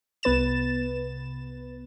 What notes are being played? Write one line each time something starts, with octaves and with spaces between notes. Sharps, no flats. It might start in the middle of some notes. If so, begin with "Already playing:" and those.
C2 B3 B4 A6 E7